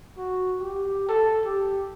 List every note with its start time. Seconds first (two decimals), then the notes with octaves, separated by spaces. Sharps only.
0.17 F#4
0.61 G4
1.09 A4
1.45 G4